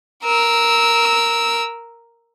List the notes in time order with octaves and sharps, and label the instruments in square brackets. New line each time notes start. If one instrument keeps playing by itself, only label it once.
[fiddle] A#4 E6